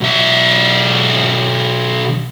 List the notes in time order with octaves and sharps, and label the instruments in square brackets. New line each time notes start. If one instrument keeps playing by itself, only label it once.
[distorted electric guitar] B1 E5